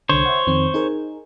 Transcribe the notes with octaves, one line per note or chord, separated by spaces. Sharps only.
C2 D3 C5 C#5
E5 F#5
F2 D#3 C4
D#4 G#4 A#4